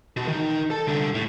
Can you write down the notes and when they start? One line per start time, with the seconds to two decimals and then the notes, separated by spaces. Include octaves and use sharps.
0.17 B2
0.28 D#3 D#4
0.70 A4 A5
0.87 C2 D3
1.15 A2